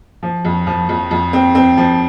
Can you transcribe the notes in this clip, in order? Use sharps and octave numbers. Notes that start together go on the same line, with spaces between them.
F3
F2
F3
F2
F2
C4
C4
F3